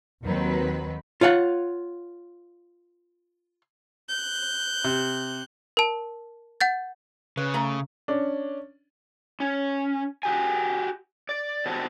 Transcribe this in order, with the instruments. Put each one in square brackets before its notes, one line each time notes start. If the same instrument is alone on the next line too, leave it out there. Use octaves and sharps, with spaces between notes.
[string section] D#2 D#3 F#3 C4 B4
[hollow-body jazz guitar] F4 C#5 F5 F#5
[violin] F#6 G6
[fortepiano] C3
[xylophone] A#4 A5
F#5 G6 A6
[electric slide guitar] C#3 [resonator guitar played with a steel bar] B4
[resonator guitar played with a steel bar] A3 A#5
[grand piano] C#4 D4
[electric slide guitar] C#4
F#4 G4 G#5
D5
B3 C4 D4 F#4 G4 A4